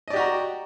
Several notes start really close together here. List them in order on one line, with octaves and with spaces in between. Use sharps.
D#5 D5 G4 F#4 A#5